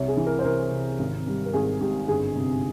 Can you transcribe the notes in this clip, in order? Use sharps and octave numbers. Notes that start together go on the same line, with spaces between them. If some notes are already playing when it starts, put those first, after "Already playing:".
Already playing: C2 C#5
G#4
E3
A#4
C5
C2 A#4
C3
G#1
G3
A#4
G#1 G#4
G#2 G4
G1 G#4
C3